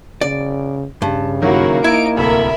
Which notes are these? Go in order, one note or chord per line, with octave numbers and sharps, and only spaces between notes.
C#3 D5
G2 C#3 A5
D#3 F#3 A#3 C#4 E4 F#4
A#3 D#4 E4 G#6 D7
D1 C2 A4 A#4 E5 B5